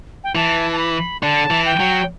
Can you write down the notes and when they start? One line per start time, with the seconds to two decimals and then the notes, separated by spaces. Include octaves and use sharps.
0.24 G5
0.35 E3 A5
0.72 A5
0.79 B5
1.22 D3 A5
1.50 E3
1.66 G5
1.80 F#3